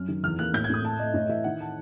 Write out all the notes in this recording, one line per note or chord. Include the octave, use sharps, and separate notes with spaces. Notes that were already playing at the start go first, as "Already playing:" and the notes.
Already playing: F#2 F6
D#3
E2 F6
A#3 F#6
A2 G6
G#6
A2 D#6
A3 A5
A3 D#5
A2 D#5
E3 E5
D#3 F#5
A5